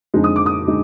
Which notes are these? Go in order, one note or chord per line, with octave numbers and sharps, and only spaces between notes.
F2 D3 G#3 D#4
D#6
D6
D#6
D3 G#3 D#4